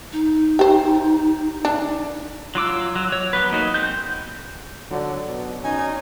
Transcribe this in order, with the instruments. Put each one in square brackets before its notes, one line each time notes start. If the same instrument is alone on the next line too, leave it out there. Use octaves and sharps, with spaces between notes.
[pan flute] D#4
[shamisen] G4 C5
D4
[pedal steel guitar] F#3 F4 D6 E6
F#3
C#5
F#3 B3 B4
A#3 D#4 F#4
G#3 C4 G6
[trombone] D3 [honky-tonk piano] F#3 F#4 D5
[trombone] B2
[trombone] C#4 [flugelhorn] D#4 [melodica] G#5